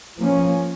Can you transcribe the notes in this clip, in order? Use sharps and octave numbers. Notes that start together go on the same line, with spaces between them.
F3 A#3 C#4